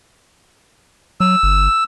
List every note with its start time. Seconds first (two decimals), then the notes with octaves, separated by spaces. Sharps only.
1.20 F#3 E6
1.43 G1